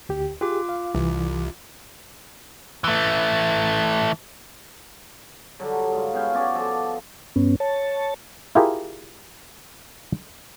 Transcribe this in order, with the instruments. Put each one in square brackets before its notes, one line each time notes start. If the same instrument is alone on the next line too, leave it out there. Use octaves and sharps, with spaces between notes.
[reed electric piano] D2 G4
[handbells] F4 D6 [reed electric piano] G4 G#4
[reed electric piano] F5
[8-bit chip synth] C2 [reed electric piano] E3
[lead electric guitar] E3 A3
[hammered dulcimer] D3 F#3 G3
G#2 F4
B3 C#4 F5 G5
B3 C#4 F#4 D5
F3 A4 D5
[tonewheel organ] G2 B3 C#4
C#5 A5
[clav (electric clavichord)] E4 F4 G4 G#4 A#4